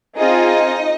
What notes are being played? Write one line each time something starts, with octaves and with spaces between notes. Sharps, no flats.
C4 D#4 F4 G#4 D#5